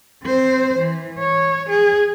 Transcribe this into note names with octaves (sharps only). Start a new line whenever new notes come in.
C4 C5
E3
C#5
G#4